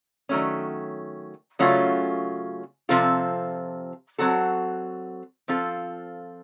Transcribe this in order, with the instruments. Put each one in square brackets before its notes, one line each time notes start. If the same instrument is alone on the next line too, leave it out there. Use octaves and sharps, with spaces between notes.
[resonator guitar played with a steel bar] D#3 F#3 A3 C#4
C#3 F#3 A3 C#4 F4
C3 F3 C4 F4 A4
F#3 C4 F#4 A4
F3 C4 F4 A4